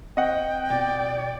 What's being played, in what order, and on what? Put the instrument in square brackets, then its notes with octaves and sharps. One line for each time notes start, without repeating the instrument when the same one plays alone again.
[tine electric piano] C4 [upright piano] D#5 F#5 [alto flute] G5
[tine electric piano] B2 [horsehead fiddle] D5